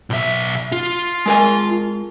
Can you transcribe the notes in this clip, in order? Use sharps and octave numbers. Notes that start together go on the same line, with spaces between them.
B1 E5
F4
G#3 A#4 G#5